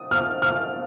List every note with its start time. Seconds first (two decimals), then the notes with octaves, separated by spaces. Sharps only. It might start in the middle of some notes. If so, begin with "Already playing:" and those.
Already playing: D#6
0.11 F6
0.42 F6